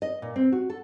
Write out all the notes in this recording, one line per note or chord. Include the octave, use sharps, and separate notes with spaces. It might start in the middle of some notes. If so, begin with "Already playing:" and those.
D#5
A#2
C4
F#4
A4